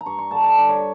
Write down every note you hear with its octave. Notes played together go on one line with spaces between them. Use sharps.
A#5
G2 C#6
C#6
D3 G3 A5
A5
G2 D5
C#5